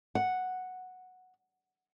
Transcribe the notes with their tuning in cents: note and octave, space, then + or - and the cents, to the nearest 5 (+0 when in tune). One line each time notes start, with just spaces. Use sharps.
F#5 -5